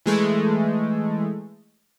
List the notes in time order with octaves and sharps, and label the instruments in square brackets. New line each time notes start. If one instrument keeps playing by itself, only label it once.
[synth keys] E3 G#3 A3